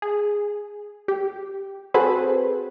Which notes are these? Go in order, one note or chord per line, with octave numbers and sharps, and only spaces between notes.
G#4
G4
C4 F#4 G#4 A4 B4 C5